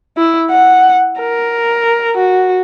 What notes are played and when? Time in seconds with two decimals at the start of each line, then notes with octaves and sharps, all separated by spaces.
0.17 E4
0.50 F#5
1.20 A#4
2.17 F#4